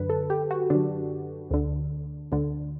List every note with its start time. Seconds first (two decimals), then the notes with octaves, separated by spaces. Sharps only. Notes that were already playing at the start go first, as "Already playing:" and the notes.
Already playing: F#2 D3 B4
0.10 A4
0.30 G4
0.51 F#4
0.70 F#2 D3 D4
1.51 D2 D3
2.32 D2 D3